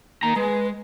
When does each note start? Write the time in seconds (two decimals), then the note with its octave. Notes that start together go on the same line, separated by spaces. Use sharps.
0.23 D#3 A#3 A#5
0.36 G#3 B4